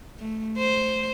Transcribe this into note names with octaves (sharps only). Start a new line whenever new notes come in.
A3
C5